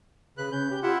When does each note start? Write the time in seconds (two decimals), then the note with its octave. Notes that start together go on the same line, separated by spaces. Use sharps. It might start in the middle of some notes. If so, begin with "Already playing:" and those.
0.38 C#3 B4 F#6
0.52 C#4 G6
0.71 G4
0.83 E4 F4 E5 F#5